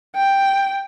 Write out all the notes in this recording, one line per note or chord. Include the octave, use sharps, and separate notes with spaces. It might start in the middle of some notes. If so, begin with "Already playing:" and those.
G5